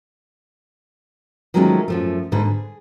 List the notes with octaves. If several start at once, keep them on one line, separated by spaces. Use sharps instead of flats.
D#3 F3 F#3 G#3 A3 C#4
F#2 F3 A3
G#2 D3 B4
G#4